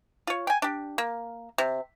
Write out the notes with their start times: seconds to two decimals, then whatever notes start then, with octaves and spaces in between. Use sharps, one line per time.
0.27 F4 C#5
0.47 G5 G#5
0.62 D4 G4
0.98 A#3
1.58 C3